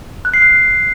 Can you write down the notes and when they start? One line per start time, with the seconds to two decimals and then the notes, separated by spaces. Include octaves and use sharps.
0.25 F#6
0.34 C7
0.42 F#6